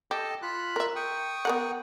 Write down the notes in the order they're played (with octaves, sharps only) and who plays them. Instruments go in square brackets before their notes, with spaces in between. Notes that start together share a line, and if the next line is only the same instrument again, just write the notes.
[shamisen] G4 [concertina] A4 D#5 A5
[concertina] F4 B5 F#6
[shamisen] A#4 E5
[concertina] G5 C#6 D#6
[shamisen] B3 A#4 F#5